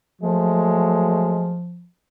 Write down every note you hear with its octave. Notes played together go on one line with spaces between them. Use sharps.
F3 F#3 G#3 A3